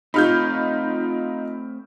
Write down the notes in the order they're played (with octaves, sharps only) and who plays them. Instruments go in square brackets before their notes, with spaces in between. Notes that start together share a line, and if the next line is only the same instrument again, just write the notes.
[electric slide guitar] A3 C4 [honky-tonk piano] D#4 F4 [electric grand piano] B5 F6 G6